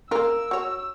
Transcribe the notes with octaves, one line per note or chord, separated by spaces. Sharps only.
A#3 F4 A#4 E6
F#4 C#5